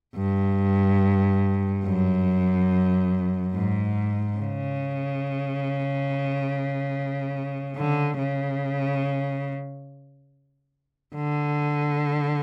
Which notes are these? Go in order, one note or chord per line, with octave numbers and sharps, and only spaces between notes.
G2
F#2
G#2
C#3
D3
C#3
D3